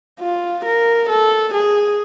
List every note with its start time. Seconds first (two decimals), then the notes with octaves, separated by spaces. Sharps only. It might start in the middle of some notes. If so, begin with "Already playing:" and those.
0.20 F4
0.65 A#4
1.09 A4
1.54 G#4